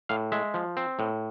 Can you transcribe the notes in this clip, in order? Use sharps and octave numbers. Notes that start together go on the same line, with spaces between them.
A2 F5
G#3 E5
F3
C4
A2